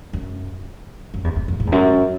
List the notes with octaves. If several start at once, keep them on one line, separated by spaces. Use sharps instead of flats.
F#2
F#2
E2
F#2
F#2
G#2
E2
F#2